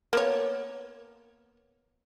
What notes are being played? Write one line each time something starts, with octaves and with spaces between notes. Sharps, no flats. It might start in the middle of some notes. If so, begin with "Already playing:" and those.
A#3 B3 C#5